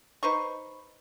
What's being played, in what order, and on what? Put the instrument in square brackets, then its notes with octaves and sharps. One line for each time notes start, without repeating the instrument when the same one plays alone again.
[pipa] D#4 B4 C5 C#6